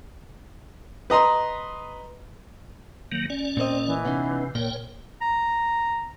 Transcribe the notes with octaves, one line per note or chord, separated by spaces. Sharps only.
B4 D#5 A#5 C6
D#3 F#3 A#3
C#4 D5
A#2 A#3 C4 D#5
E3
C3 B3 C#4 D#4
A#2 A#4 C#5 G5
A#5